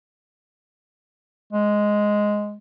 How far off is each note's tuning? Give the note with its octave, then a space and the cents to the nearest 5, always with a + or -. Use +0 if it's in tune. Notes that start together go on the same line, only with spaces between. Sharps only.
G#3 +0